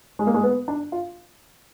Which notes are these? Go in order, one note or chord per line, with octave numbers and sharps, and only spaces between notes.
G#3
A#3
G#3
B3
D4
F4